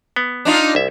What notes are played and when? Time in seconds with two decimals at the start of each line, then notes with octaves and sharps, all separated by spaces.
0.16 B3
0.45 D4 D#4 F4
0.75 C2 E5